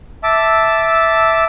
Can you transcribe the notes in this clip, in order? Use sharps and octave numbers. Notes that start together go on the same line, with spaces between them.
E5 A5 D6 E6